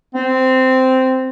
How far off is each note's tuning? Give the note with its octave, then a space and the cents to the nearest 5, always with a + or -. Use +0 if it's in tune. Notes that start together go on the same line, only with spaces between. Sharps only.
C4 -10